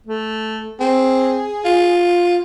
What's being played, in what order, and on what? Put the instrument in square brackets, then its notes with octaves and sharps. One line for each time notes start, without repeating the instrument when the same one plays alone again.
[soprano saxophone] A3
[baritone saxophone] C4 [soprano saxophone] G#4
[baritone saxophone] F4